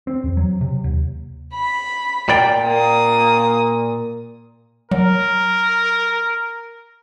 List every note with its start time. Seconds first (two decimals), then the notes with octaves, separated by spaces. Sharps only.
0.07 C4
0.24 E2
0.37 F#3
0.61 C3
0.84 D#2
1.54 B5
2.29 A#2 D5 G5
2.64 A#3 D#6
4.91 F#3 A#4